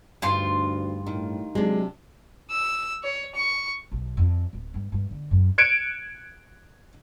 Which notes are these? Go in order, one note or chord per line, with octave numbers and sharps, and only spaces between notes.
D2 G2 D#4 F4 C5 C6
A2 D#3
C3 F#3 G#3 D4
E6
C#5
C#6
B1
F2
D1
G2
G2
D3
F#2
F#6 G#6 C#7 D7 E7